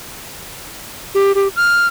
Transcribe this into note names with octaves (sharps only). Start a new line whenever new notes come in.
G4
G4
F6